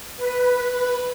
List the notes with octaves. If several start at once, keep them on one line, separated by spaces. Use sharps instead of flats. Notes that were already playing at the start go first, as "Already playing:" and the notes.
B4